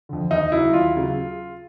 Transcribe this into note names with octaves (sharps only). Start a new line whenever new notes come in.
F2 D3
D#2 D#4
C#3 F#3 E4
D#2 F4
C#3 F#3